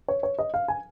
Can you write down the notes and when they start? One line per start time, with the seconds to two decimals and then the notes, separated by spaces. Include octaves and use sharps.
0.08 C#5
0.23 C#5
0.39 D#5
0.54 F5
0.68 G#5